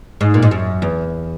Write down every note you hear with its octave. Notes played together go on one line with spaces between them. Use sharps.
G#2
A#2
G#2
F#2
E2